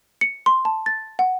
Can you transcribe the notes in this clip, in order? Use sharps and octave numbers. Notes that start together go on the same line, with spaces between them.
C#7
C6
A5
A6
F#5